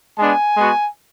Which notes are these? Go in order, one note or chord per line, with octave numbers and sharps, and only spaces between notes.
G#3 B3 D4 G#5
G#3 B3 F#4